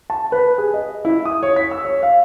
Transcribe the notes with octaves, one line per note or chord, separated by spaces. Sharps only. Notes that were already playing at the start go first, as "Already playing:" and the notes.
A5
B4
G#4
D#5
E4
D#6
C#5
B6
E6
C#5
F5